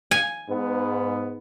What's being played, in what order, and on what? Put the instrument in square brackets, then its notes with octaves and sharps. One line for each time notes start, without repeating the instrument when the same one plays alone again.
[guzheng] G#5
[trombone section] G#2 B3